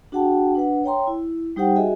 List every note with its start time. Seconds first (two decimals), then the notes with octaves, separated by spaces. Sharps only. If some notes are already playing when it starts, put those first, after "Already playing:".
0.12 D4 F#4 G#4 F#5 G5 A5
0.55 D4 B4 F#5
0.84 C#5 G5 A#5 C6
1.07 E4
1.56 G3 D#4 G4 C5 F#5 G5
1.76 F#4 G#4 D#5 E5 G#5